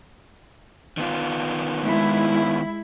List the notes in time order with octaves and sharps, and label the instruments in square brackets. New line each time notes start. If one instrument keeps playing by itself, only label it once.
[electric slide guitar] D#3 B3 F4
[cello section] G#3 E4